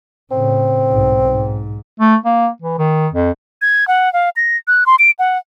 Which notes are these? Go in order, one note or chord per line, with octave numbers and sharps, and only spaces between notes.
A2 C#3 C4
B1 G#2
G#2
A3
A#3
E3
D#3
F2
G#6
F#5
F5
A#6
F#6
C6
D7
F#5